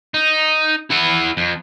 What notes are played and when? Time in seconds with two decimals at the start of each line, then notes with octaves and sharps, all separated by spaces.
0.14 D#4
0.91 E4 F#5
1.37 F2